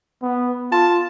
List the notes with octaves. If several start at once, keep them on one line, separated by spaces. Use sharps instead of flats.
B3
F4 A5